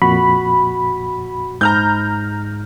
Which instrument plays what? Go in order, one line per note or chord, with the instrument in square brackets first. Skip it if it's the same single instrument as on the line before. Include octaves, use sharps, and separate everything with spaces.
[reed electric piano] F2 A#2 [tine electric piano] F#4 [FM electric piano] B5
[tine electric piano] G#2 [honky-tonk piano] A#5 F6 G6